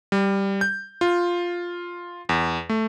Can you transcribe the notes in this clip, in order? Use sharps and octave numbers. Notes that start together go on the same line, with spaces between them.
G3
G6
F4
E2
A3